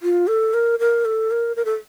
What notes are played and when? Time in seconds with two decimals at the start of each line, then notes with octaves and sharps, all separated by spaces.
0.02 F4
0.27 A4
0.54 A#4
0.79 A#4
1.05 A4
1.31 A#4
1.56 A#4
1.65 A4